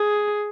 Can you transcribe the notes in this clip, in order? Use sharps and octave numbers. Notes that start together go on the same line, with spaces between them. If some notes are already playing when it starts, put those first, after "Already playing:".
Already playing: G#4